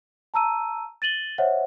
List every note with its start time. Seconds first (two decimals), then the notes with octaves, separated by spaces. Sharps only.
0.34 A5 A#5 E6 D#7
1.02 A6 D#7 F#7 G7
1.38 C5 C#5 D#5 E5 F#5